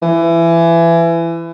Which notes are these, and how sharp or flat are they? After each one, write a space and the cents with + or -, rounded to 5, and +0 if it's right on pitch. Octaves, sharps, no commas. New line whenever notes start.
E3 +25